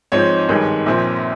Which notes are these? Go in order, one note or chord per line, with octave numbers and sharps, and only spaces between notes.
G#2 F3 C4 D#4 C#5
G#1 G2 D#3 G#3
A#1 A#2 F3 C4